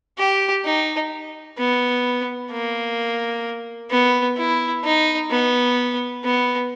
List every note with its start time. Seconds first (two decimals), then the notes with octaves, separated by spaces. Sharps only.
0.18 G4
0.65 D#4
1.58 B3
2.51 A#3
3.91 B3
4.37 E4
4.84 D#4
5.31 B3
6.24 B3